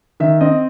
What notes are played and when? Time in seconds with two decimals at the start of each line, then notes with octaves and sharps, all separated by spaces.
0.20 D#3 E5
0.41 C4 D#5